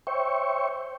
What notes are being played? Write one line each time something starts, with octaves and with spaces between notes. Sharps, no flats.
C5 C#5 E5 G5 C#6